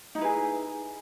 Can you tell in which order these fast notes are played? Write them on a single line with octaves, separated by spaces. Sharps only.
D#4 E4 B4 G#4